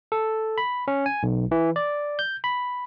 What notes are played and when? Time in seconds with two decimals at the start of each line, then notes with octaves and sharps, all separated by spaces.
0.12 A4
0.58 B5
0.88 C#4
1.06 G#5
1.23 B1
1.51 E3
1.76 D5
2.19 G6
2.44 B5